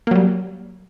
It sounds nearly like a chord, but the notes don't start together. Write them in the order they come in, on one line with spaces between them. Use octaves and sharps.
A#3 F#3 G3